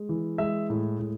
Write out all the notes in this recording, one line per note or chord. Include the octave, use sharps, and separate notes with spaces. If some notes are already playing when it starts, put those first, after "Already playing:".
Already playing: G#3
E3
G#3 E5
A2
A2